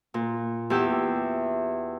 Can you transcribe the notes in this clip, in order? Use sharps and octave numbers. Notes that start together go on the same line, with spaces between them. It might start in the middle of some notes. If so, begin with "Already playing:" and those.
A#2
E2 G4 E5